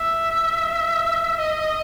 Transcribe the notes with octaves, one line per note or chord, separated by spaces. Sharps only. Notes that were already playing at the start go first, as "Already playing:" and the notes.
Already playing: E5
D#5